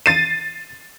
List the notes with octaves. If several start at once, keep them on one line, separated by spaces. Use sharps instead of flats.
A6 C7 D#7